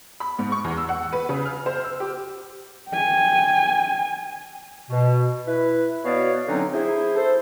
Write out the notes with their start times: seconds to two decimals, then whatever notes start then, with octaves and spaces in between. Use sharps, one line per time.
0.20 B5
0.39 G#2
0.52 C#6
0.64 E2
0.77 E6
0.89 F#5
1.13 B4
1.29 C#3
1.45 F6
1.66 C5
1.84 E6
2.00 G4
2.91 G5 G#5
4.90 B2
5.47 E4 B4
6.05 B2 B3 F#4 C#5 D5 F5
6.48 D3 F#3 C4 C#4 D#4
6.73 E4 G#4 C5
7.16 A4 C5